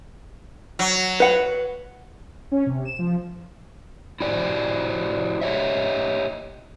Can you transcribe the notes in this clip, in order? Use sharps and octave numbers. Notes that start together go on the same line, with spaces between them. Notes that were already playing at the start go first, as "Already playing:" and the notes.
F#3
B4 F#5
C#4
C3
E7
F3
E4 F#4 G4 C5 D5
G4 C#5 D#5 E5